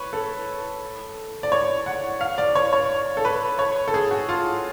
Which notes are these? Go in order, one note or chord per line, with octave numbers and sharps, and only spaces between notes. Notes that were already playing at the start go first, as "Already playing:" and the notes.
Already playing: B4 C#5
A4
D5
C#5
F#5
F5
D5
C#5
C#5
A4
B4
C#5
A4
G#4
F#4
F4